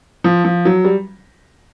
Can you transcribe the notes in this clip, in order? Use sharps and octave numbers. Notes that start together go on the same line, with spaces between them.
F3
F3
F#3
G3